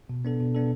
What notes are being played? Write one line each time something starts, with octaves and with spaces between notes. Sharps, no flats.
B2
B3 D4 A4
B2
B3 D4 A4